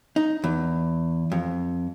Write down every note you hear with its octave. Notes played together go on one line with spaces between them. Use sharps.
D#4
E2
F2